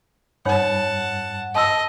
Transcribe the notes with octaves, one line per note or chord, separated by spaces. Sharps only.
G2 D#4 C#5 F#5 A5 B5
D#5 A5 C6 E6